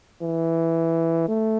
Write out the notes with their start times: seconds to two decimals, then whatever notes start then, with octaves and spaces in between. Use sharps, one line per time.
0.22 E3
1.28 A3